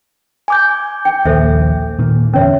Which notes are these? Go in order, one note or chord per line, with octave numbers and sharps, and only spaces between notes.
G#5 D6 G6
G5
A#1 D#2 A4 C5 E5
A#2 D#3 A#3
E2 D3 C4 C#4 C#5 E5